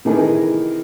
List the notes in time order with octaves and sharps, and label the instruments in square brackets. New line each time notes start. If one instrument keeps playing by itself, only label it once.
[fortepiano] C3 D#3 E3 G#4 A#4